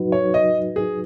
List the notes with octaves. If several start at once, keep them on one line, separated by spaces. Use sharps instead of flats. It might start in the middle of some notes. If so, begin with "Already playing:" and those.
Already playing: F#3 D#4 F#4 B4
C#5
D#5
G#4